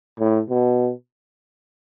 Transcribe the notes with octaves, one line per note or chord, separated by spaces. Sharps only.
A2
B2